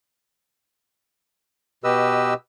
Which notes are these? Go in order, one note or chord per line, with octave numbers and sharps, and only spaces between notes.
B2 G4 B4 D#5 E6